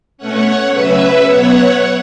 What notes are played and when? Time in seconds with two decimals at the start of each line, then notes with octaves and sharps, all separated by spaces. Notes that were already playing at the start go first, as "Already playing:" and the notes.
0.18 B2 A3 C#4 C#5 F#5
0.72 C#3 F#3 C#4 B4 E5
1.26 B2 F#3 B3 C#5 F#5